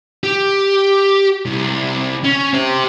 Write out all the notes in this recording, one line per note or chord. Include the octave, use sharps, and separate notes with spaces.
G4
C2
C#4
G4 C5